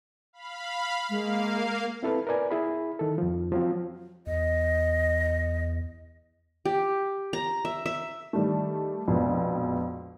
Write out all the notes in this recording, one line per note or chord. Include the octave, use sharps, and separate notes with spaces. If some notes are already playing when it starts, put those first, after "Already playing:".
F5 B5
G#3 A#3 F5
C4 E4 A4 B4
A#4 B4 D5 G#5
E4 G#4 B5
D#3 A4
F2 F3
F3 F#3 C4
E2 D#5
G4
A#5
E5
E5
D#3 G3 A3
A#1 F2 B2 G#3